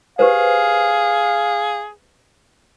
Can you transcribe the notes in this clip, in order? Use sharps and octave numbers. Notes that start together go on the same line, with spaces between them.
G4 G#4 B4 C5 F5